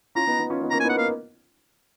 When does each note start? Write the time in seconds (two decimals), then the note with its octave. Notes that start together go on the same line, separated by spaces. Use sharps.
0.15 C#4 F4 A#5
0.27 B3 D#4
0.39 B3 D#4
0.50 C#4 F4
0.62 B3 D#4
0.71 A#3 C#4 A#5
0.80 B3 D#4 G#5
0.89 F#5
0.96 A#3 F5